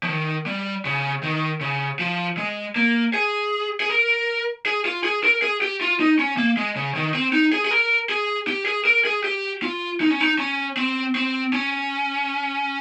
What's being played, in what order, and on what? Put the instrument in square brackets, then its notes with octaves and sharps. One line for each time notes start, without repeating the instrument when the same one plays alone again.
[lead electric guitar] F3
D#3
G3
C#3
D#3
C#3
F3
G#3
A#3
G#4
G#4
A#4
G#4
F4
G#4
A#4
G#4
G4
F4
D#4
C#4
A#3
G#3
C#3
D#3
C4
D#4
G#4
G#4
A#4
G#4
G4
G#4
A#4
G#4
G4
F4
D#4
C#4
D#4
C#4
C4
C4
C#4